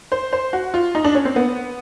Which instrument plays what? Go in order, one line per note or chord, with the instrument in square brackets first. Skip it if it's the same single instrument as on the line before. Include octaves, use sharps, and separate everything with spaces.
[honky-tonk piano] C5
C5
F#4
F4
D#4
D4
C#4
C4
B3